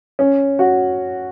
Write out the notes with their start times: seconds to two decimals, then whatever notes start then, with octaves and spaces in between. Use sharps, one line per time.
0.19 C#4
0.59 F#4